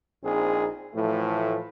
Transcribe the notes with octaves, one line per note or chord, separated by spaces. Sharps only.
A#1 C4 D#4 G#4
A2 E3 F3 A3